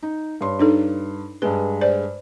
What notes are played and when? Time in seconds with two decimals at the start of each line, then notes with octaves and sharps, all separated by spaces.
0.03 D#4
0.41 G2 C#5 C6
0.59 D4 D#4 A4
1.42 G2 G#3 B4
1.81 C5 D5